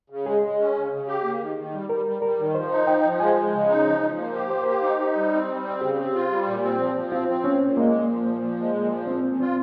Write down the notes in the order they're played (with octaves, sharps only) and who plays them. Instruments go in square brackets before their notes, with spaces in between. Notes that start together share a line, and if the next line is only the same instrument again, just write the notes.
[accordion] C#3
[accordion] G#3 [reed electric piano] G#4
[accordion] G#3
C#4
C#3
C#3
G4
A#3
D#3
D#3
G3
[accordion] G3 [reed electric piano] A#4
[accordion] G3
[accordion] G3 [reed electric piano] A#4
[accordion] D#3
[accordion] F3 [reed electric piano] C5
[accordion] D#4
[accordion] F3 [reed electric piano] G5
[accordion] F3
[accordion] G#3 [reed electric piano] G#5
[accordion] G#3
C#3
D#4
F3
F3
A#3
G4
[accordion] A#3 [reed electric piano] C5
[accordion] G4
D#4
D#4
G3
C4
G3
C4
[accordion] C#3 [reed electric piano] G4
[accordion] C4
F4
G3
A#2
C4
F3
F3
[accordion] C4 [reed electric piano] F4
[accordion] C4
[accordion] A#2 [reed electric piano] C#4
[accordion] A#2
[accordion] G#3 [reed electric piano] A#3
[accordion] A#2
F3
A#2
F3
G#3
A#2
F3
[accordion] A#2 [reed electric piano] C4
[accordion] A#2
[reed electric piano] C4 [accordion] F4